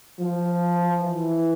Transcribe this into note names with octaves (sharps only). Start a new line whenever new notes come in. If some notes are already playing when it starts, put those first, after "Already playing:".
F3
E3